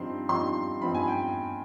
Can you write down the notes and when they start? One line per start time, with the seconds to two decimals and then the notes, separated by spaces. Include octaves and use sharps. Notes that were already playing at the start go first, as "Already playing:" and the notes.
Already playing: G2 F3 C4 D#4 C6
0.29 G2 F3 C4 D#4 C6
0.81 G2 F3 C4 D#4 B5
0.95 G#5
1.08 G5